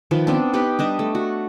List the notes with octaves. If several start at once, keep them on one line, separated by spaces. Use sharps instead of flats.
D#3 F3 B4
B3 C4 D4
B3 D#4 G4 B4
G3 D4 D#5
A3
F#4